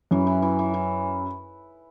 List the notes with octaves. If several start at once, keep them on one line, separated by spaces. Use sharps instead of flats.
F#2 E3
E3
E3
E3
E3